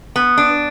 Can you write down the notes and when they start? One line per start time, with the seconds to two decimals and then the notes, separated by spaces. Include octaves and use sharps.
0.16 B3
0.38 D4